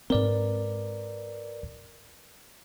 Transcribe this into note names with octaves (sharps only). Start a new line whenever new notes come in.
G#2 C4 A#4 B4 D5